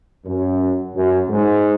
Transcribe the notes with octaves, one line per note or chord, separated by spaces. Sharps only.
F#2
F#2
G#2